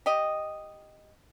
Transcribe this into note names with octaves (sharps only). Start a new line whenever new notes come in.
G4 D#5